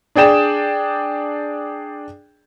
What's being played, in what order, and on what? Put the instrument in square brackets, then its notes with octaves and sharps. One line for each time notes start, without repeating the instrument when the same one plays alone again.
[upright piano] D4 G#4 D5 G5 E7